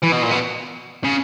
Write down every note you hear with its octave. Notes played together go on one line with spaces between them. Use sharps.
E3
B2
A#2
B2
C#3